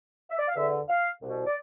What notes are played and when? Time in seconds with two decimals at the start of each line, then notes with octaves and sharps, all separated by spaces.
0.30 E5
0.39 D5
0.48 F5
0.55 E2 D3 E5
0.89 F5
1.22 C2 B2
1.46 D5